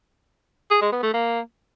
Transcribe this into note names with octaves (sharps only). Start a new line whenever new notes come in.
G#4
G#3
B3
A3
A#3